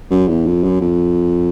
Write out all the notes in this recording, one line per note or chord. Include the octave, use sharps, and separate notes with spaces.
F#2
E2
F2
F#2
F2